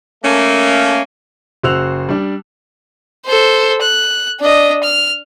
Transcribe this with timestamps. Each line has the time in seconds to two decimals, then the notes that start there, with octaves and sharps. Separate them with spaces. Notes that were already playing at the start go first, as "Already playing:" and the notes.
0.24 A3 A#3 C#4
1.63 F#1 F#4 C5 E6 F#6 F7
2.09 G3 D4
3.26 A4 C5
3.82 F#6
4.40 D4 D#5
4.83 F6